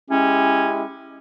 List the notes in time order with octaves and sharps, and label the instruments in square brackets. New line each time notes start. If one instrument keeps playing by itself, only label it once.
[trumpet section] G#3 E4 G4 [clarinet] C#4